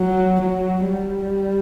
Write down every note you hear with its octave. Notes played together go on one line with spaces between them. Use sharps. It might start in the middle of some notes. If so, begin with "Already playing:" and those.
Already playing: F#3
F#3
G3